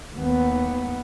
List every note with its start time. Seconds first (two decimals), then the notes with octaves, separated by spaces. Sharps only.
0.16 D#2 B3